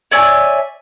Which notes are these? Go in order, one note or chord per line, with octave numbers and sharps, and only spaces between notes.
C#5 D5 E5 G#5